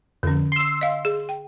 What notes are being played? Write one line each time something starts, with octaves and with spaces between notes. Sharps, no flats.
F2 D3 C#4
C6 E6
D#5 F5
G#4
G5